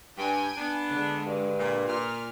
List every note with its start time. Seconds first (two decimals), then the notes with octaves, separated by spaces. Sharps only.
0.17 G2 G5 G#5
0.57 B3 D4
0.90 D3 G#3
1.26 G2
1.59 A#2
1.88 A#2 F6